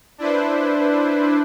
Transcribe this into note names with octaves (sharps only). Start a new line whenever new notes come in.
D4 E4 B4 C5